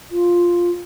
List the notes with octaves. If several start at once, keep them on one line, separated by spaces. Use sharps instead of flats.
F4